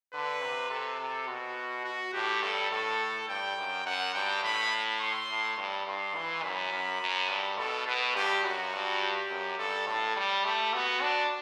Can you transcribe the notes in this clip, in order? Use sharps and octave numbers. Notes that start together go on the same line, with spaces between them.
D3 B4
C3
C3 A4
C3
B2 F#4
F#4
A2 G4
G2 A4
A2 A4
G2 G5
F#2
F#2 F#5
G2 G5
A2 B5
C6
A2
G2
G2 C6
E3
F#2 B5
F#2
F#2
G2
B2 A4
B2 B4
G2 G4
F#2 F#4
G2
G4
F#2
G2 A4
A2 A4
G3
A3 G4
B3 F#4
D4